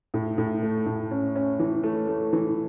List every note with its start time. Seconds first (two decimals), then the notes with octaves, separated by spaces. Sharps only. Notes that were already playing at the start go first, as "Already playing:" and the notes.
0.14 A2
0.38 A2
0.63 A3
0.86 A2
1.11 C#4
1.36 C#4
1.59 E3
1.83 A3
2.08 A3
2.33 E3